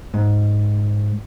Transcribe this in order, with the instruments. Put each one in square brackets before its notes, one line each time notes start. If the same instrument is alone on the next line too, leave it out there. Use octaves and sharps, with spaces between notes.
[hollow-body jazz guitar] G#2